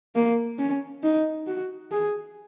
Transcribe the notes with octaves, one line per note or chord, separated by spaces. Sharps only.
A#3
C#4
D#4
F#4
G#4